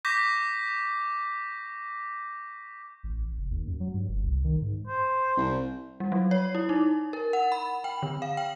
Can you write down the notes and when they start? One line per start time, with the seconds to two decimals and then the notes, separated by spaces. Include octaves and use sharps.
0.05 C#6 D6 G6 A#6 B6
3.04 A1
3.37 F1
3.51 D#2
3.66 F#2
3.80 F#3
3.94 G2
4.09 F#1
4.23 C2
4.44 D#3
4.62 G#2
4.87 C5
5.37 C2
6.00 G3
6.12 F#3
6.31 C#5
6.55 E4
6.69 D#4
7.13 A#4
7.33 F#5
7.52 B5
7.84 G5
8.03 D3
8.22 F5
8.37 G5